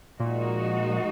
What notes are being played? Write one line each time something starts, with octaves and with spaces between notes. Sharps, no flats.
A#2 F3 G#3 D#4 F#4